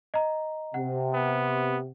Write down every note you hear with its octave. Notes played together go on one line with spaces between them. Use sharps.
D#5 A#5
C3 F#5
B3